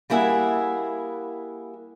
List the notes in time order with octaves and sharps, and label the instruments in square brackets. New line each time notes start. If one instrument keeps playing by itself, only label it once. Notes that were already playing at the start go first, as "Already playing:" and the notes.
[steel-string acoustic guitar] G3 A#3 E4 G#4 E5 F#5